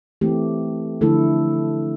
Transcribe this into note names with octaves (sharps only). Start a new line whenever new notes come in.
E3 A3 C4 G4
D3 F3 A3 E4 A4